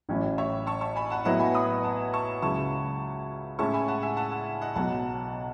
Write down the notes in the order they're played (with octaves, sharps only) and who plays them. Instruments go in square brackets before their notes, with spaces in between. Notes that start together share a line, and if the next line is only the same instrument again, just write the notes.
[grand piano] A1 A2 F#3 C#4 E4
[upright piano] C#5 E5
A5 C#6
A5 C#6
G#5 B5
F#5 A5
[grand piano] A2 F#3 B3 E4 [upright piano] D#5 F#5
[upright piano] G#5 B5
B5 D#6
F#5 A5
A5 C#6
[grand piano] C#2 C#3 F#3 C#4 E4 [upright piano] A5 C#6
[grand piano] A2 G#3 C#4 E4 [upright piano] A5 C#6
[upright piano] G#5 B5
F#5 A5
E5 G#5
F#5 A5
F#5 A5
D#5 F#5
[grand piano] B1 B2 F#3 [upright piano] F#5 A5